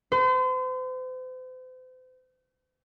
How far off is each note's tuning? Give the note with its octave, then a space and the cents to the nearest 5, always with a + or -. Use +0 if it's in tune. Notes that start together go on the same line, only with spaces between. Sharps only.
C5 -40